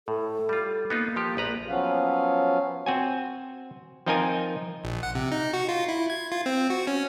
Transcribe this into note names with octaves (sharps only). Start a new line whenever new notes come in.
A2 A4
G3 F4
A#3 B3 D#4 F4
F3 G4
A#1 B4 A#5
F3 F#3 B3 C#4 F5
C4 F#4 G#5
F3 C4 D#4 F4 A#4 G#5
A#1
F#5
C3
D#4
F#4
F4
E4
G#6
F4
C4
F#4
C#4